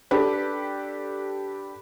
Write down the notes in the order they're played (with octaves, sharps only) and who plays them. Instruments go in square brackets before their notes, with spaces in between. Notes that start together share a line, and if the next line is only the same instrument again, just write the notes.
[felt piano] D4 G4 A4 B4